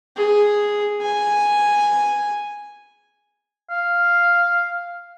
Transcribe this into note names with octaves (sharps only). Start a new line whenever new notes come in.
G#4
G#5
F5